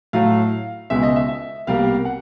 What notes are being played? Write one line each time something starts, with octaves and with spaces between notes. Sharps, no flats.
A2 F#3 A3 F5
C#2 B2 G#3 E5
D#5
E5
E5
C2 B2 G3 A#3 F5
F#5